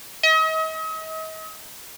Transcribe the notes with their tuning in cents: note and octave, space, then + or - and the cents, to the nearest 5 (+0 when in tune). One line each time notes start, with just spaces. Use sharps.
D#5 +40